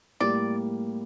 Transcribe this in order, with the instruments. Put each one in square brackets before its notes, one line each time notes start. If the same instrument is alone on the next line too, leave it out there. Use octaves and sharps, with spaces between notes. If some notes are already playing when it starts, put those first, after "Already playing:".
[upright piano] A2 G3 A#3 [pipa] D5